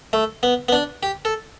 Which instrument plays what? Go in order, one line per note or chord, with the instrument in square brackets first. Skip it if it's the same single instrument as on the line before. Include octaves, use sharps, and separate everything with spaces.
[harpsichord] A3
B3
B3
D4
G4
A4